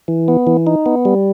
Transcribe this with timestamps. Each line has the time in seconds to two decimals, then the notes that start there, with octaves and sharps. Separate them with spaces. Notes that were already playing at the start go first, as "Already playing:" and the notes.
0.08 E3
0.28 B3
0.47 E3
0.67 D#4
0.86 B3
1.05 G3